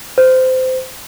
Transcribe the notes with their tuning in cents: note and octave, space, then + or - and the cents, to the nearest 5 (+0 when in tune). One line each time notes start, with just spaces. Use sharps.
C5 -20